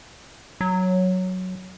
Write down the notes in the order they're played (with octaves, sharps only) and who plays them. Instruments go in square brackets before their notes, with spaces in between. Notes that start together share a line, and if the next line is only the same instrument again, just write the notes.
[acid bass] F#3